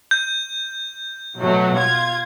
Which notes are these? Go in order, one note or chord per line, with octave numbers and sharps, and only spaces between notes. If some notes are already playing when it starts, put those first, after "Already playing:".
G6
B2 F#3 A3
F4 G#6